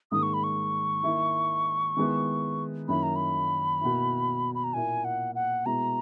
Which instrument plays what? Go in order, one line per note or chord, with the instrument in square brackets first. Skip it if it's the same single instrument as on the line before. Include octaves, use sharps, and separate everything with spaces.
[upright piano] G#2 D#3 A#3 [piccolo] D#6
[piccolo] C#6
B5
C#6
[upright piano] D#3 A#3 E4
D#3 G#3 B3 E4
[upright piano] F#2 D#3 A#3 E4 [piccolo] B5
[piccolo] A#5
B5
[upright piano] B2 A#3 E4
[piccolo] B5
A#5
[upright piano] A#2 A#3 E4 [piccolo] G#5
[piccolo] F#5
F#5
[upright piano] B2 G#3 B3 E4 [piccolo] A#5